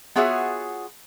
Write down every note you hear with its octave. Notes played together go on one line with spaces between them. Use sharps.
B3 F4 F#4 G#4 C#5 E5